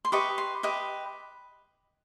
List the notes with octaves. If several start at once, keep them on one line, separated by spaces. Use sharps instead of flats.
C6
G4 B4 D#5 C#6
C6
G4 B4 D#5